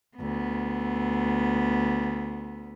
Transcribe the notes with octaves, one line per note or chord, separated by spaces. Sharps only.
D2 B3